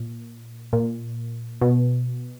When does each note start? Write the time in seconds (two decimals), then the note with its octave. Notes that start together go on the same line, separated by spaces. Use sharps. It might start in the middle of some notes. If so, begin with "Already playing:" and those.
Already playing: A#2
0.73 A#2
1.61 B2